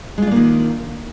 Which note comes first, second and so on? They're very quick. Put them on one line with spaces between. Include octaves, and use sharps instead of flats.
G#3 F4 D4 A#3 D#3